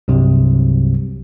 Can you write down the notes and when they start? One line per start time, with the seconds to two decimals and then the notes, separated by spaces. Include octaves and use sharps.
0.08 C2 G2 C3 F#3